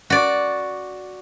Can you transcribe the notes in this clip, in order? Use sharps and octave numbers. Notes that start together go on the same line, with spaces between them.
F#4 D5